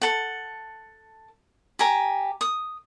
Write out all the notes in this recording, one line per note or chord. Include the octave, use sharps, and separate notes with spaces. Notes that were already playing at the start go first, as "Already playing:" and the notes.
A4 F#5
G4 G#5 A#5
D#6